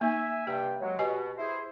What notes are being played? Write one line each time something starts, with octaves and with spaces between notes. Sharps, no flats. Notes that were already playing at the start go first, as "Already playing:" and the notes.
A#3 D#4 E5 G#5
G2 C3 G4 G5
F#3 G#3
B2 G4 D#5 G#5
E4 G#4 C5